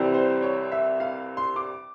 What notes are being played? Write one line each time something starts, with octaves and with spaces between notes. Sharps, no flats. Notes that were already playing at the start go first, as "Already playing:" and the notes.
Already playing: C2 C3 E3 G3 C4
C5
C#5
E5
F5
C6
D6